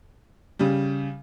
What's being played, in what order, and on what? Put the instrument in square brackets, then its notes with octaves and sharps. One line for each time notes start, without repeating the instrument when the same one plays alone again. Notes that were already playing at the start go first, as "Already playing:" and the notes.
[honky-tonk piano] C#3 G3